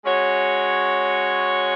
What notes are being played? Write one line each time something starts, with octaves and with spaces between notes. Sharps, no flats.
G#3 C#4 F#4 C#5